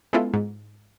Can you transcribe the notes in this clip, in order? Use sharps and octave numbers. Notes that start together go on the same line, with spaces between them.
G#3 B3 C#4 E4 F4 A4
G#2